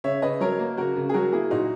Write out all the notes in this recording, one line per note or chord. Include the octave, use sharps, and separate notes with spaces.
C#3 C#5 E5
C#3 B4 D#5
F#3 A#4 C#5
A#3
C#3 F#4 A#4
C#3
G#4
F#3 F#4 A#4
A#3 E4 G#4
A#2 D#4 F#4